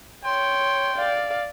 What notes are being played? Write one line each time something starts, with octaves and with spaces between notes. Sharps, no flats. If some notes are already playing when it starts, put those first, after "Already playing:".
C#5 G5 C6
D5 F5